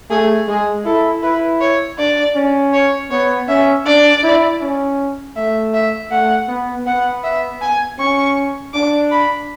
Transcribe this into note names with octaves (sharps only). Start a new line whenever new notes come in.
A3 G#4
G#3 G#4
E4 A4
E4 B4
C#5
D4 D5
C#4
C#5
B3 C#5
C#4 E5
D4 D5
E4
C#4
A3 E5
E5
A3 F#5
B3
B3 F#5
E5
G#5
C#4 C#6
D4 D6
B5